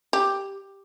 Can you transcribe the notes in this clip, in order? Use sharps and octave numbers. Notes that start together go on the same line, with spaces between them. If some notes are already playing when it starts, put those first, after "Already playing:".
G4